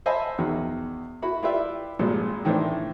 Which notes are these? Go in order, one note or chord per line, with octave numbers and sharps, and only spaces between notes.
C5 D#5 E5 G#5 A5 B5
E2 B2 D#3
E4 F#4 B5
E4 F4 G4 B4 D5 E5
G#1 G2 A#2 F3 G#3
A2 D#3 E3 A3 C4 D4